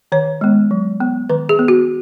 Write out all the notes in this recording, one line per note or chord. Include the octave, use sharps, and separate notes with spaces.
D#3 C#5
G#3 B3
F#3
B3
D#3 B4
G#4
B3
F#4